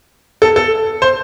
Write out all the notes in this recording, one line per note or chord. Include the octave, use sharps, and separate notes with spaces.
A4
A4
C5